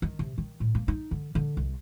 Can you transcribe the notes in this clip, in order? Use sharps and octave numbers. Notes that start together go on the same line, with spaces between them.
D#3
C3
D#3
A2
A#3
D#4
D3
D3
C2